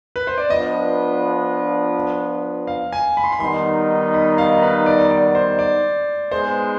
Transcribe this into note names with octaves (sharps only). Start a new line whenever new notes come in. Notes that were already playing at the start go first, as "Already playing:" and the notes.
B4
C5
D5
F3 B3 D4 F4 B4 D#5
F5
G#5
B5
C6
B5
D#3 G3 B3 D#4 C6
B5
F5
B4
D5
D5
C5
D5
G#3 B3 D#4 G#4 B4 C5